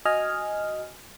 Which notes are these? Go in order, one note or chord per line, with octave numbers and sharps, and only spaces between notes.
F#4 D#5 G#5 F6